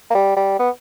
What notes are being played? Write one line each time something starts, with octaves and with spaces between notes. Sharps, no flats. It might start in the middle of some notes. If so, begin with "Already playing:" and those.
A#3
G3
G3
B3